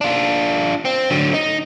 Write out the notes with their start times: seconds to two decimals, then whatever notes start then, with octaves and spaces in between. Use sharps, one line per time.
0.01 D4 F4
0.85 C4
1.10 D3 F#3
1.34 D#4